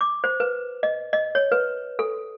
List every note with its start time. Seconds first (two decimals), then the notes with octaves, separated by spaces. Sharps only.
0.01 D6
0.24 C5
0.40 B4
0.83 D#5
1.13 D#5
1.35 C#5
1.52 B4
1.99 A4